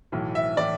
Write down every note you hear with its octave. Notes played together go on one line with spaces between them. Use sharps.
B1 A2 E3
E5
A2 E3 D5